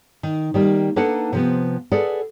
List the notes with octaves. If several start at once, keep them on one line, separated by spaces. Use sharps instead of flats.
D#3
D#3 G3 A#3
A#3 D4 D#4 A4 B4 F#5
C3 F3 B3
G#4 A4 B4 D5 F#5